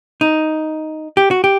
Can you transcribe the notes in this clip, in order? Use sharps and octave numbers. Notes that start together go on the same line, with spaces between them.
D#4
G4
F#4
G4